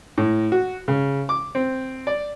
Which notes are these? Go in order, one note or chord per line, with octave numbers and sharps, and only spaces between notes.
A2
F#4
C#3
D6
C4
D5